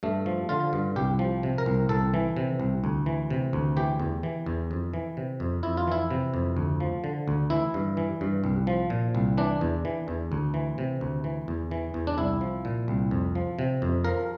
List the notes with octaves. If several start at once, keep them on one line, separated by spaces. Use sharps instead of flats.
G2 A3
F3
D3 F4
G2
C2 G4
F3
C3
A#4
C2
C2 A4
E3
C3
C2
D2
E3
C3
D2
E3 G4
E2
E3
E2
F2
E3
C3
F2
F2 E4
F4
E3 E4
C3
F2
D2
F3
D3
D2
E3 E4
G2
E3
G2
C2
F3
A#2
C2
E3 D4
E2
E3
E2
D2
E3
C3
D2
E3
E2
E3
E2
D4
C2 E4
F3
A#2
C2
F2
F3
C3
F2
F3 A#4